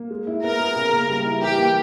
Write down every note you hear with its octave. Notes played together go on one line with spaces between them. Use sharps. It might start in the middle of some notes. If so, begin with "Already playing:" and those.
Already playing: A#3
G#3
E4
B3 A#4
G#4
C#3
A#3
G3
E4
E3 G4
A#3